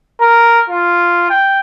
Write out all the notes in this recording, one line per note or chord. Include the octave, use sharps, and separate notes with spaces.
A#4
F4
G5